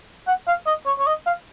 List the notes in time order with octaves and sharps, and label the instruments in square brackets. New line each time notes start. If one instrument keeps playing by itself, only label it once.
[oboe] F#5
F5
D#5
C#5
C#5
D#5
F5